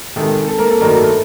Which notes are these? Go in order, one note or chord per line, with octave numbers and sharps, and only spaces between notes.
C3 D#3 G#3 A4
A4
A#3 A#4
A4
G2 D#3 F#3 A3 A#3 A#4
A4